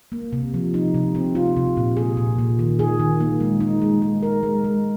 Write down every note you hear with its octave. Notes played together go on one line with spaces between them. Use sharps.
A#3
C3
F3
D#4
C3
C4
F4
C3
A#2
G#4
A#2
A#2
D#3
G#4
D#3
A#3
G#3
D#4
G#3
G#3
A#4
G#3
G#3